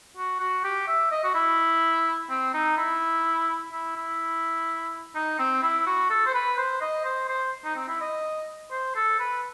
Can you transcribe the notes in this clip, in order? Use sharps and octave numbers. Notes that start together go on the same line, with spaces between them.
F#4
F#4
G4
E5
D#5
F#4
E4
C4
D#4
E4
E4
E4
D#4
C4
E4
F#4
A4
C5
B4
C5
D#5
C5
C5
D#4
C4
E4
D#5
C5
A4
B4